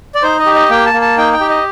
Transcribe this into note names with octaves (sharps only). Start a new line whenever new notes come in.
D5
D#4 C5
D#5
G4
D#5
A#3 G5
A5
A#3
A5
D#4 G5
G5
G4
D#5